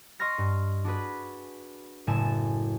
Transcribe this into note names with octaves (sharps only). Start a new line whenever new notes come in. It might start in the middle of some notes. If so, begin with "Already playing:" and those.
D#5 C6 C#6 F6 A#6 C#7
G2
D4 F#4 G#4 B4
F#1 A2 A3 G#5 A5 E7